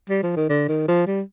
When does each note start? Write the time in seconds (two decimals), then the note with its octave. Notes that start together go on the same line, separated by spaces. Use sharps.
0.10 G3
0.23 F3
0.36 D#3
0.49 D3
0.68 D#3
0.88 F3
1.06 G3